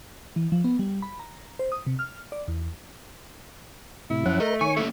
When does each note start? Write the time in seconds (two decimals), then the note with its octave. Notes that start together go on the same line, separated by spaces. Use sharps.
0.36 E3
0.52 F3
0.64 B3
0.79 G3
1.02 B5
1.20 A#5
1.59 C5
1.72 D#6
1.86 C3
1.99 F6
2.32 D5
2.48 E2
4.10 A2 C3 E4
4.26 F#2 F3 C#4 F#5
4.40 A3 A#4 D#5
4.61 D#3 C#5 G#5 C#6
4.77 A3 A#3 C#4 E5